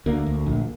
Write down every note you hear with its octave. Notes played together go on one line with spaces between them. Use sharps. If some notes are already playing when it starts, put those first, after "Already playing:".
D2 A#3
D2
A#1